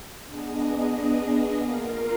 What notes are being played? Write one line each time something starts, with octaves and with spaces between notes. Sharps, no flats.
B3 D4 G#4 D#5
A#3 F4 A#4 F5